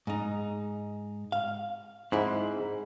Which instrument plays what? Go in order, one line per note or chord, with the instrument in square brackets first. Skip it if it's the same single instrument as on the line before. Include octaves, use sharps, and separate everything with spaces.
[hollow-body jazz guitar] G#2 D#4
F5
[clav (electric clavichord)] G#2 [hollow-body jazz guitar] C4 E4